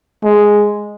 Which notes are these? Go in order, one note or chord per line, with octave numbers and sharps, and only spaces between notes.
G#3